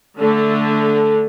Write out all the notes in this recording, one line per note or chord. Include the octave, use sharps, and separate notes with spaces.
D3 A3